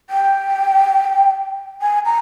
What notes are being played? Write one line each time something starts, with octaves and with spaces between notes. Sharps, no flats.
G5
G#5
A#5